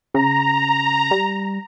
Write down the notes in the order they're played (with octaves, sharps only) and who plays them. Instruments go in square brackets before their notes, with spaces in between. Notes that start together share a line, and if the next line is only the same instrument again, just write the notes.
[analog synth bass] C#3 [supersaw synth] A#5
[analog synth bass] G3